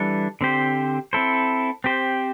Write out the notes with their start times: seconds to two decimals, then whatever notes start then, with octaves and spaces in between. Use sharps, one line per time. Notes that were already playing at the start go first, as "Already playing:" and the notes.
Already playing: E3 G3 D4 A4
0.41 D3 C4 G4 C5
1.13 C4 E4 A4 C5
1.84 C4 G4 C5